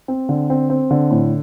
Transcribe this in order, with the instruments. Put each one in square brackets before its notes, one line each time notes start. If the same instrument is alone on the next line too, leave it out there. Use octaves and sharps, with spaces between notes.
[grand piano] C4
D3
C4
C4
D3
A2